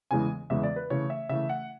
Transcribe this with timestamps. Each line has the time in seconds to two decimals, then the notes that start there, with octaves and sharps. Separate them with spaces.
0.11 E2 C#3 E3 G#3 G#5
0.50 E2 C#3 E3 G#3 E5
0.63 D5
0.76 B4
0.90 C#3 E3 A3 C#5
1.10 E5
1.29 C#3 E3 A3 E5
1.49 F#5